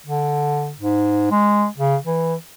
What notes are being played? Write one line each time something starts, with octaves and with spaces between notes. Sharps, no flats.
D3
G#2
G#3
C#3
E3